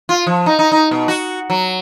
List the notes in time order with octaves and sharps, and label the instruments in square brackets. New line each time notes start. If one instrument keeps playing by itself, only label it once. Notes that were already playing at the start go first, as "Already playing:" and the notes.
[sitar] F4
F3
D#4
D#4
D#4
B2
F#4
F#3